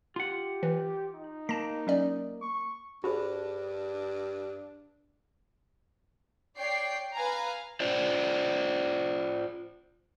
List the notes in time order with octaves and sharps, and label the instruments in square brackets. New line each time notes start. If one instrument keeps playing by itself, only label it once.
[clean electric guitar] F4 F#5 [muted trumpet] G4
[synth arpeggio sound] E3
[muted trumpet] D#4
[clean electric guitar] A#3 [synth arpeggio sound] A5 A#6
[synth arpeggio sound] F#3 C#4 D5
[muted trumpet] C#6
[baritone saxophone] G2 [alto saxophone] D4 [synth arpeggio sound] F#4 [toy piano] G#4 C5 B5
[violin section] C#5 D5 G5 C7
B4 F5 G#5 A#5
[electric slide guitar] F4 C5 D5